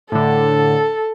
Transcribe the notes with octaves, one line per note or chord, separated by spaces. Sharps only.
A2 D3 A4